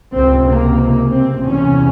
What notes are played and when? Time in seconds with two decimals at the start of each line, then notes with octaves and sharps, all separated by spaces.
0.15 C#2 C3 C4
0.47 A#3
1.12 C4
1.44 E2 C3 C#4